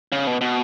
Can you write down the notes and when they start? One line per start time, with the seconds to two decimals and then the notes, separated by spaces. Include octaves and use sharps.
0.12 C#3
0.27 B2
0.41 B2